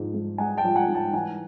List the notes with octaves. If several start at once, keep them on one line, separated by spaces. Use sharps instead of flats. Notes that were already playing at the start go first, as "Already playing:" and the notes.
Already playing: G#2 F3
G#2
G#3 F#5 G#5
G5 A5
F3
F#5 G#5
G#2
G5 A5
E3 F#5 G#5